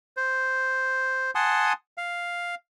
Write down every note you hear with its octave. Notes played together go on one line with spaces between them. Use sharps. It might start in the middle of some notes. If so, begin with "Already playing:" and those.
C5
F#5 G#5 A5 C6 D#6
F5